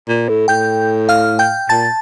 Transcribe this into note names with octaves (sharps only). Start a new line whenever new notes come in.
A#2
A2
A2 G5 G6
F5 F6
G5 G6
A#2 A5 A6